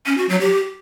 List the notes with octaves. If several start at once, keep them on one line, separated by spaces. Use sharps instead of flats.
C#4
F#4
F#3
G4